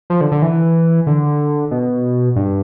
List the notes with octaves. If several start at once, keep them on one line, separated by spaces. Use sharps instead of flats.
F3
D3
D3
E3
D3
B2
G2